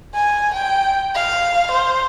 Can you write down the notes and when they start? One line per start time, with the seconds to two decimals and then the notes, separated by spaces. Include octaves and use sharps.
0.15 G#5
0.55 G5
1.15 F5
1.72 C5